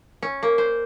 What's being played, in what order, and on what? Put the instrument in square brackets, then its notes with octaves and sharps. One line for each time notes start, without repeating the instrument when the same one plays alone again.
[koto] C#4
A#3
C5